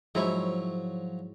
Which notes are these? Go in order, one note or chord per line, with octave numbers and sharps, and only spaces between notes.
G#2 F3 F#3 E4 C#5